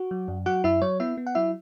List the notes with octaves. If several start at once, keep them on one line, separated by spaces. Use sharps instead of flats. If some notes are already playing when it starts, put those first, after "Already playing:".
Already playing: F#4
F#3
F#2
F#3 F#4 F#5
F#2 E4 E5
F#3 C#5
B3 E4 E5
B3
F#5
F#3 E4 E5